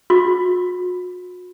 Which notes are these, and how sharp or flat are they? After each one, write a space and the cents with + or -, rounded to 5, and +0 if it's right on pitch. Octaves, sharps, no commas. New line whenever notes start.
F#4 -45